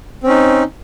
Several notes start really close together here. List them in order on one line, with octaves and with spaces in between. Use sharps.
C4 C#4 D#4